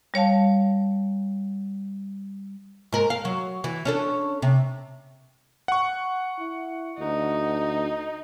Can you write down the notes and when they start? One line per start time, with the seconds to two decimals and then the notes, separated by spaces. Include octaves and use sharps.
0.14 G3 C#5 F5 A5
2.92 G#2 A#4
3.10 F5
3.25 F#3
3.64 E3
3.85 C#4 D4 A4
4.42 C3
5.68 F#5 C#6
6.39 E4
6.99 D2 D#4